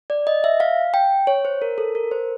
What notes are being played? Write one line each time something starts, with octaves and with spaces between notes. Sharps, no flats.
D5
D#5
E5
F5
G5
C#5
C5
A#4
A4
A#4
C5